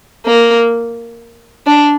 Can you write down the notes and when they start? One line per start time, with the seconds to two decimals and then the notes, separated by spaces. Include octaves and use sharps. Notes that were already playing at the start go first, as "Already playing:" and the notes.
0.26 A#3
1.67 D4